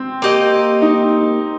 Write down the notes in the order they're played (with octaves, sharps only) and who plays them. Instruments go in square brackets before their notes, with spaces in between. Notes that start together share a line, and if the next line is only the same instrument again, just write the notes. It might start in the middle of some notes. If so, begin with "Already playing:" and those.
Already playing: [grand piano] C4
[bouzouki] A#3 G4 A#4 D#5
[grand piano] D#4